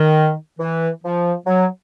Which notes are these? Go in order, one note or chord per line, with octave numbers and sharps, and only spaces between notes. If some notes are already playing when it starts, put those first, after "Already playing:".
Already playing: D#3
E3
F3
F#3